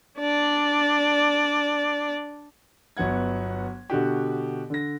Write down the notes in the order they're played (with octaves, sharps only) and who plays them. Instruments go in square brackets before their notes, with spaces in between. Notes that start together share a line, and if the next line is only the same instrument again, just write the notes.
[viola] D4 D5
[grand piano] G1 F#3 B3 F#5 G#6
B2 D3 F#4 G4
D3 A#6